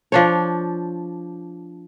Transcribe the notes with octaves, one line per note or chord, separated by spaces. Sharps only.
F3 D4 C#5